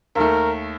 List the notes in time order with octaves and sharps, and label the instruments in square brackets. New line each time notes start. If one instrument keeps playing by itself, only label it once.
[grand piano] D#2 D#3 A3 [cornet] A#4